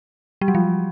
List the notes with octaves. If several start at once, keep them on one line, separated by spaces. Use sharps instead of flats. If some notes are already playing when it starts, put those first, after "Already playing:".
G3
F#3
F3